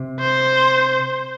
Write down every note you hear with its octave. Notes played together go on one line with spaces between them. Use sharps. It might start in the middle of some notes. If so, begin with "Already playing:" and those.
Already playing: C3
C5